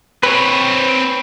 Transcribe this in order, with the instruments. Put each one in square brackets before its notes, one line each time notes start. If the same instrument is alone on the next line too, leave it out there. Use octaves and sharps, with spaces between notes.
[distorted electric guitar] C4 C#5 [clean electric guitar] B4